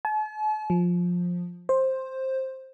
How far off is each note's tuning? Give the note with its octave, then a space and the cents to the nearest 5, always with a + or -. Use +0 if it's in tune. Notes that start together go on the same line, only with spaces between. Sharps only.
A5 -45
F3 +15
C5 +10